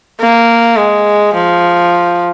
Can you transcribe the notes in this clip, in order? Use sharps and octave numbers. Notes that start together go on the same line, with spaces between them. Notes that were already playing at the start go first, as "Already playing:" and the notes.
A#3
G#3
F3